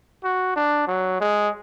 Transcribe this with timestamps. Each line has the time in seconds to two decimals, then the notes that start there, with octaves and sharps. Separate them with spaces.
0.24 F#4
0.56 D4
0.87 F#3
1.21 G#3